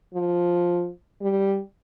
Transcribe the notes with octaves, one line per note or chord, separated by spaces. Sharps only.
F3
G3